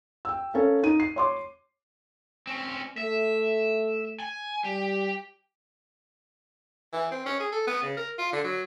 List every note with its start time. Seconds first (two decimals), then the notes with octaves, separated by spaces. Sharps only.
0.25 G5 E6
0.54 C#4 A4 A#4 F5
0.83 D#4 D#7
1.00 C7
1.16 C#5 C6 D6
2.47 C4 C#4
2.98 A3 E5
4.20 G#5
4.64 G3 G4
6.93 E3
7.11 C4
7.26 C#4
7.40 G#4
7.52 A4
7.67 B3
7.83 C#3
7.97 A#4
8.18 F4
8.32 D3
8.44 F#3